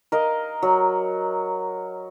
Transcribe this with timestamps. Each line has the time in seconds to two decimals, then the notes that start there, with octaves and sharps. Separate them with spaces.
0.12 A#4 D#5 F5
0.62 F#3